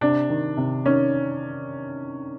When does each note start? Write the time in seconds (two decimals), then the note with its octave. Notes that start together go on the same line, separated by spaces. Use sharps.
0.01 C3 D4
0.29 D#3
0.57 C3
0.85 D#3 C#4